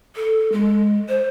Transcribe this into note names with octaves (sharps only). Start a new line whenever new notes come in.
A4
G#3
C5